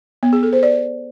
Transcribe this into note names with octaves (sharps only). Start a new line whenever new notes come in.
B3
G#4
A4
C5
D5